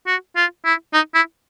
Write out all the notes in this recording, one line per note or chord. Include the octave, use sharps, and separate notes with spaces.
F#4
F4
E4
D#4
E4